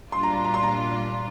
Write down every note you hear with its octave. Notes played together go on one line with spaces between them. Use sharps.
A#2 G3 D4 F4 C6
A#5
A#5
A#5
C6
A#5